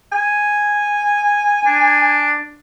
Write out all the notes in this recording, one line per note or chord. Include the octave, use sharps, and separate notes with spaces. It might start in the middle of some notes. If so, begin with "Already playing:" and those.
G#5
D4